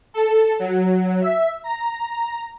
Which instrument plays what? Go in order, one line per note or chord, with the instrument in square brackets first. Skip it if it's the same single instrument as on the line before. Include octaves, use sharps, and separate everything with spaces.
[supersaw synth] A4
F#3
E5
A#5